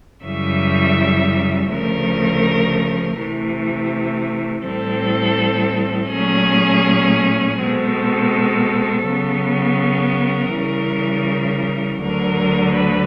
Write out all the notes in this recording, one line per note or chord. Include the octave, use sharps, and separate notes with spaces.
F#2 C#3 E3 G3 E5
D2 C#3 F3 A3 A#4
C3 E3 A3
A2 E3 G3 C4 A4
A#2 F#3 A3 C#4 G#4
B2 G#3 C4 A4
C#3 F#3 B3
A#4
C#3 E3 G3
D2 D3 F#3 A#4
B4